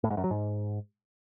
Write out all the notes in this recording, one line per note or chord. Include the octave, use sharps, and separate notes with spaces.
A2
G#2
F#2
F#3
G#2